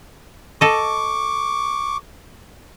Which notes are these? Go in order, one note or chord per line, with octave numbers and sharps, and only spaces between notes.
A4 D#5 C#6 D6